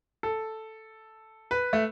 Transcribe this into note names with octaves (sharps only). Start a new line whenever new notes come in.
A4
B4
A3